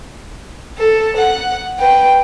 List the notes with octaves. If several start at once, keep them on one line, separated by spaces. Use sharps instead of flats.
A4
F#5
B4 G5